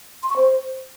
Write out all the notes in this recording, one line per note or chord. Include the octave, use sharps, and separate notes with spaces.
C6
C#6
C5